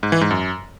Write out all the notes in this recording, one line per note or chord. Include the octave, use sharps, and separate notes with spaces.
G#2
E3
G#2
F#2